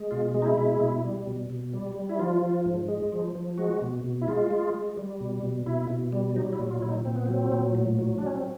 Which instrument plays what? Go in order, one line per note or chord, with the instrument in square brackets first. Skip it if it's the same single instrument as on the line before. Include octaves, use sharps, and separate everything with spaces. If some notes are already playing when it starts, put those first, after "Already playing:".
Already playing: [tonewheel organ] G#3
B2 F4
G#3
D#4
E4
B2
B2
G3
B2
B2
G3
G3
E4
F3 F4
F3
G#2
G#3
F3
F3
G#3 F#4
B2
B2
E4
G#3 F4
G#3
G#3
G3
B2
B2
B2 E4
B2
G3
F#3 D#4
E4
A#2
F4
A#2 E4
D#4
A#2 C4
B3
F#3 C4
A#2
A2
F#3
F#3 D4
C#4
C4